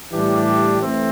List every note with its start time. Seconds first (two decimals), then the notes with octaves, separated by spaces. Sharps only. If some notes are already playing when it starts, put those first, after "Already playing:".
0.11 A2 E3 G3 D4 G4
0.77 E3 A3 C4